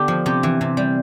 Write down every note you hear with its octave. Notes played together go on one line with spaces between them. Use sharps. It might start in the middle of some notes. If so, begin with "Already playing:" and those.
Already playing: D3 B3 D4 G4
F3
C3 G4
E3
C3
G3